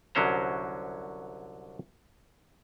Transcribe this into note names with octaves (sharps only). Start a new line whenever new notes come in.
C2 D3 F#3 C#4 C5 A#5